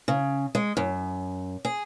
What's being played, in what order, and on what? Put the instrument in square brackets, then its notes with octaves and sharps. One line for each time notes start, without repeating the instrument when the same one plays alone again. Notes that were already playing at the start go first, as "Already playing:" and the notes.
[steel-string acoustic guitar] C#3
G#3
F#2
G#4